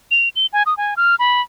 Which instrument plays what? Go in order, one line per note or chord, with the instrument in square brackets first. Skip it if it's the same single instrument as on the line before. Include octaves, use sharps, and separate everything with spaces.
[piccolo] F7
G7
G#5
D#6
G#5
F6
B5